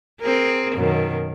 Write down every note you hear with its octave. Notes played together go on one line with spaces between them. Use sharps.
C4 G#4 A#4
F#2 B2 D#3